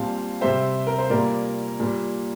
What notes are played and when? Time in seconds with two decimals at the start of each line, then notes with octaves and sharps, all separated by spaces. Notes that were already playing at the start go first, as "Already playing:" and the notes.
Already playing: A#2 G3 C4 F5 A5
0.41 C3 G3 C4 C5 E5
0.87 A#4
0.98 C5
1.10 A#2 G3 A#3 A#4 D5
1.80 A#2 G3 A#3